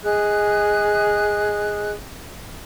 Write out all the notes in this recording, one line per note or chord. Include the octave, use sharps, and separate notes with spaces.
G#4 D#5 F#6